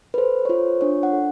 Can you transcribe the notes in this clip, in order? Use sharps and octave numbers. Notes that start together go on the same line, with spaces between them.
B4
A4 C5
C#5
F4 C5
D4 C#5
F#5
A4